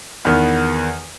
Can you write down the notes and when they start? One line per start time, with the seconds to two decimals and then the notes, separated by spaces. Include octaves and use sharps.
0.25 E2 D#3 B3